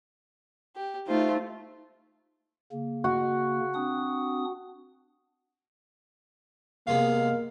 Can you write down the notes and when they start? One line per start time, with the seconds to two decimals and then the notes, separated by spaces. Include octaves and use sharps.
0.76 G4
1.07 A3 D#4 F4 C5
2.72 C#3 A#3
3.04 F#4
3.75 C4 D4 D#6
6.87 C3 G#3 A#3 B3 F5